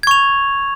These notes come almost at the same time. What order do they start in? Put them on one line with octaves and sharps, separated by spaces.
G#6 C#6 F7